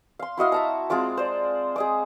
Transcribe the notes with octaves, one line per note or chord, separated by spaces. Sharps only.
F5 C6
E4 F#4 D#5 F5
E5 A5 A#5
G#3 C4 F4 D6
C5 D5
G#4 D#5 D6